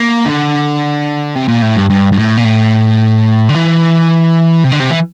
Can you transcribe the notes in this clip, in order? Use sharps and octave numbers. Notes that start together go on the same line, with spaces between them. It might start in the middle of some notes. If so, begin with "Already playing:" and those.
Already playing: A#3
D3
C3
A#2
A2
G2
G2
G2
A2
A#2
A2
D3
E3
C3
D3
C3
E3